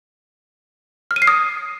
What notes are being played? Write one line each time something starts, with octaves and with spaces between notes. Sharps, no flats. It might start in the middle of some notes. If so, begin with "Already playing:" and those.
F6
D#7
C7
D#6